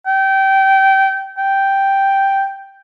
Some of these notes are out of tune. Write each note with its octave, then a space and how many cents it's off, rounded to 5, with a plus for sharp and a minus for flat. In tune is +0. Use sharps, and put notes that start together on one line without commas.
G5 -20
G5 +0